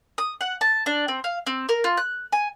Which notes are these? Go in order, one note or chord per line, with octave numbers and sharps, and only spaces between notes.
D#6
F#5
A5
D4
C4
F5
C4
A#4
F4
F#6
G#5